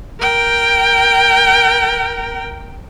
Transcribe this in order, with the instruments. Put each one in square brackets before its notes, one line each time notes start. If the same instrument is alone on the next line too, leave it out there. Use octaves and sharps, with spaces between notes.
[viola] A#4 G5